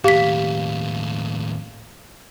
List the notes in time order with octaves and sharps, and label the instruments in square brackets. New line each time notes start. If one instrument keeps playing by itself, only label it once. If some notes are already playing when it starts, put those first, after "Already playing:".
[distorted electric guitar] D#2 A2 [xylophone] G4 B6 [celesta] F5